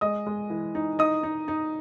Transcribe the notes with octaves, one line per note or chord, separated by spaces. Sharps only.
G#3 D#5 D#6
G#3
E3
D#4
D#4 D#5 D#6
D#4
D#4